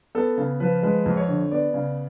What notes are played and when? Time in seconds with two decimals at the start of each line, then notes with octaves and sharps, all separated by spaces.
0.15 B3 A4
0.38 C#3
0.60 F3 B4
0.83 G#3 B4
1.06 F2
1.17 C#5
1.28 D3
1.51 B3 D5
1.74 C#3